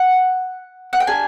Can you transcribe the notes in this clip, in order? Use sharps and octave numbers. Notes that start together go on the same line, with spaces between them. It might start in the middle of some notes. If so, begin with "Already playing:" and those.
Already playing: F#5
F#5
G5
A#3 D4 G4 G#5